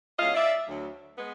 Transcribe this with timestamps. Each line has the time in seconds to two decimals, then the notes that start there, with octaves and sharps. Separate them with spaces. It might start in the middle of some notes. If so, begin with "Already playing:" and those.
0.19 B2 G#3 C#4 E4 D#5 F5
0.35 D5 E5
0.68 D2 D3 F#3
1.18 G#3 B3